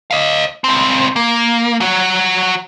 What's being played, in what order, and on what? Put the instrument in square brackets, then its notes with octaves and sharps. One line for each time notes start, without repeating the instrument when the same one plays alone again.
[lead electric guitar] D#5 F5
C#2 C4
A#3
F#3 F#4